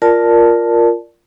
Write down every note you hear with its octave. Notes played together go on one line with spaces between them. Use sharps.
F4 A#4 D5 A5